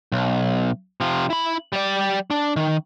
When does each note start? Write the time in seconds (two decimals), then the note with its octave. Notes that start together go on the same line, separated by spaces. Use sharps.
0.12 B1
1.01 C3 F3
1.30 E4 B5
1.73 G3 D5
2.31 D4
2.56 D#3